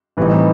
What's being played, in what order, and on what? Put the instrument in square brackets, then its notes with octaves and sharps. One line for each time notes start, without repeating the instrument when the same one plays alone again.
[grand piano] A2 E3 G3 C4 D#4